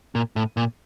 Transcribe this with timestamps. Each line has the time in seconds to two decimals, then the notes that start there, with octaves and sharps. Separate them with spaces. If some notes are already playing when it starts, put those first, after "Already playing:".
0.15 A#2
0.36 A2
0.57 A#2